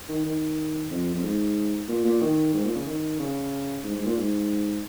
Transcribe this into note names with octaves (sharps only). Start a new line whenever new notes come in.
D#3
D#3
F2
F2
G#2
A#2
A#2
D#3
G#2
A#2
C#3
D#3
C#3
G#2
G#2
A#2
G#2